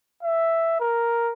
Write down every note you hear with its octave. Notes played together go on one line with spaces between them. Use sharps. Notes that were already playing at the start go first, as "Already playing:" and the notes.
E5
A#4